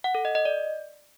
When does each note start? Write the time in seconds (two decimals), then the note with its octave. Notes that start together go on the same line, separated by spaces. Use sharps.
0.04 F#5
0.15 A4
0.25 D#5
0.35 D#5
0.45 D5